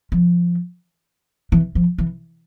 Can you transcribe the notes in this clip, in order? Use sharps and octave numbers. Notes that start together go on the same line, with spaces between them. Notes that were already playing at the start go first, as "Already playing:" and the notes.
F3
E3
F3
E3